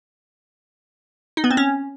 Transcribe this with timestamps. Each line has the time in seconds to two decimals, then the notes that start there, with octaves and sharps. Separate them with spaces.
1.37 D#4
1.44 B3
1.51 C4
1.57 C#4